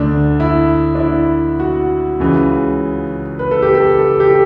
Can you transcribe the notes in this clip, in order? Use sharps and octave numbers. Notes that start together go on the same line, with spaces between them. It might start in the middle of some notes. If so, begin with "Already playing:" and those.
Already playing: D2 D3 D4
E4
D4
E4
F#4
C#2 C#3 E3
B4
A4
G4
A4
A4
G4
A4